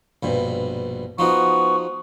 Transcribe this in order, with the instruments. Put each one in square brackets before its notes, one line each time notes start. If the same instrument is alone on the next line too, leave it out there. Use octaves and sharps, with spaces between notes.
[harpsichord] A#1 G2 B2
[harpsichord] F3 D#4 F#4 [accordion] B3 C#6